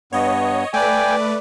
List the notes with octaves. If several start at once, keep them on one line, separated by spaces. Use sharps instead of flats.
G2 B3 C#5 D#5
A3 B4 D5 G5 G#5